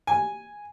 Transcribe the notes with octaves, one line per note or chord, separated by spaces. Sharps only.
G#5